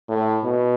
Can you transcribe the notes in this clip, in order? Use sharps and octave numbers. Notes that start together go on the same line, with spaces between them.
A2
B2